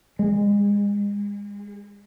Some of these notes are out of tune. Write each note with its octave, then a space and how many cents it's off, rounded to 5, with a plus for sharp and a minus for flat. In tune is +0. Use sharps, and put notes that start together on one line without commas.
G#3 -35